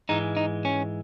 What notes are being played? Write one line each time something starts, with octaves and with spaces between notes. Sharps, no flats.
G#2 E3 G#3 D#4
D#4
C#4